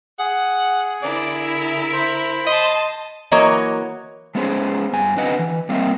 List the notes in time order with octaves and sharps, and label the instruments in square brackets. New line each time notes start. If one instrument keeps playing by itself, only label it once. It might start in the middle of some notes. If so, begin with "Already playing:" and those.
[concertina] G#4 [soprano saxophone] F#5
[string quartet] D3 E4 A#4 [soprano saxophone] D5
[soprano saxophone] E5
[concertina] C5 B5
[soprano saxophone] D#5 [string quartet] A5 C6
[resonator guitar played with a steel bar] E3 F#3 A#3 C#5 D#5
[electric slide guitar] G#3 B3 C#4 G#4 C5 C#5
G2 G#5
D3 C4 B4 D#5 F#5 G#5
E3
G3 A#3 C4 F4 D#5 E5